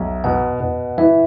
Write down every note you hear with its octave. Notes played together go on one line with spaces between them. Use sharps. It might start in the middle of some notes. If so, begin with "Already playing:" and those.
Already playing: B1 E5
B2 F#5
B2
E3 E5